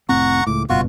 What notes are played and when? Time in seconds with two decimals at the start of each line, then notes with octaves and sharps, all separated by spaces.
0.09 F1 A2 C4 F#5 A#5 C#6
0.47 C#2 A2 D6
0.69 F#1 G2 B2 F4 F#4 C#6